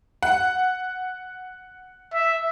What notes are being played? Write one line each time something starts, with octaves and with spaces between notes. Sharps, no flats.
F#5
E5